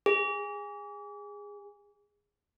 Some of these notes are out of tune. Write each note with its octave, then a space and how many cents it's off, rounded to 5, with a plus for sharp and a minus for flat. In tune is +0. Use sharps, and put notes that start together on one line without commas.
G#4 -20